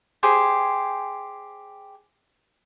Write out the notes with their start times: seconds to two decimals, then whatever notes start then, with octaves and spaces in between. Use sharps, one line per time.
0.23 G4 G#4 C5 G#5